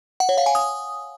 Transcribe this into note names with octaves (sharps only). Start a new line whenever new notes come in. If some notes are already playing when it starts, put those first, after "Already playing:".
F#5
C#5
F5
G#5
D#6